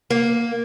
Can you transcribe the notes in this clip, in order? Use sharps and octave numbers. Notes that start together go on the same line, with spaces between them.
A#3